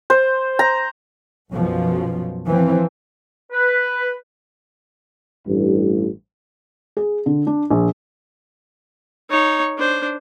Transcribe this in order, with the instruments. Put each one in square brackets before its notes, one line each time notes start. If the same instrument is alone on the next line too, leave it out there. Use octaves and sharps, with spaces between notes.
[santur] C5
A#5
[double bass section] B1 F#2 B2 F3
E3 F3 C4
[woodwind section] B4
[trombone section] A1 G2
[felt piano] G#4
D3
D4
A#1
[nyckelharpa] D#4 C#5
D4 C5